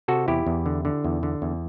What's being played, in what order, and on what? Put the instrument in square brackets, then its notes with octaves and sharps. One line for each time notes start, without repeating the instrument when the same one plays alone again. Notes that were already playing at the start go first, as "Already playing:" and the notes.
[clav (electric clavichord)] C3 F#4 A4
E2 E4 G4
E2
D3
D3
E2
D3
E2